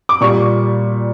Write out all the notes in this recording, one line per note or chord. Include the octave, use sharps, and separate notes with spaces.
D6
A#2 G3 C#6